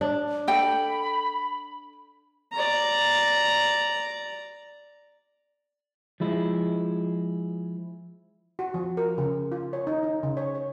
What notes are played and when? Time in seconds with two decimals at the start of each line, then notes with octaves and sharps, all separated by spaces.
0.01 D4
0.48 A4 G5 B5
2.52 D5 A#5
6.20 F3 G#3 E4
8.59 F#4
8.74 F3
8.97 A#4
9.18 C#3
9.52 F4
9.73 C#5
9.87 D#4
10.03 D#4
10.23 C#3
10.37 C#5
10.55 C#5